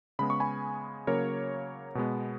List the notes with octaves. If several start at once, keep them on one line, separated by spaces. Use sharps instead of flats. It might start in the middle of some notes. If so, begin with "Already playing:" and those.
C#3 G#3 B3 B5
C#6
G#5 B5
C#3 F#3 A#3 A#4 C#5
B2 G#3 B3